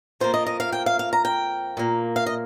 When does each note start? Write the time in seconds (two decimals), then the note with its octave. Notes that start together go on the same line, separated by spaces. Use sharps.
0.20 F2 F3 A#3 C5
0.34 D#5
0.46 D#5
0.60 F5
0.72 G5
0.86 F5
0.99 F5
1.13 A#5
1.25 G5
1.77 A#2 A#3
2.16 F5
2.26 D#5